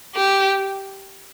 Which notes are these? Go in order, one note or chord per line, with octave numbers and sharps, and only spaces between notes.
G4